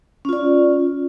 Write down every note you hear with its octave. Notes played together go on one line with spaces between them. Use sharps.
C#4 F4 D5